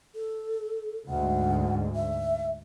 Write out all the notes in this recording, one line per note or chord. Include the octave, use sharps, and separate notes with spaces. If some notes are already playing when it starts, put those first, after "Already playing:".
A4
D2 G#2 F#5
E5